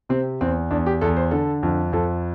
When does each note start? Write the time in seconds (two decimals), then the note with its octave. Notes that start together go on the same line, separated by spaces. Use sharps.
0.09 C3 C4
0.41 E2 C4
0.71 E2 D4
0.86 G4
1.01 E2 A4
1.16 C5
1.31 D3 A4
1.63 F2
1.93 F2 A4